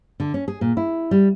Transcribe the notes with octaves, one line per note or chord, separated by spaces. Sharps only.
D3
C#4
G#4
A#2
E4
G3